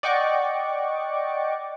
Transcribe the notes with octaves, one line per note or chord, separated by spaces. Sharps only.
D5 D#5 F#5 G5 C#6 D6